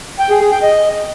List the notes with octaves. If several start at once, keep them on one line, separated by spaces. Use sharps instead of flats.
G5
G#4
G#4
G5
D#5